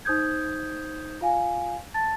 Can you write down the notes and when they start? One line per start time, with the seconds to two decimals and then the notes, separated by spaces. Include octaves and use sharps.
0.05 D#4 C5 D#6 G6 G#6
1.21 F4 F5 G#5
1.94 A5 A6